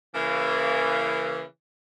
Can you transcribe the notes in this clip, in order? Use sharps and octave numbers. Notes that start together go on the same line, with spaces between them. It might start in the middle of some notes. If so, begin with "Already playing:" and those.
C#3 E3 A#3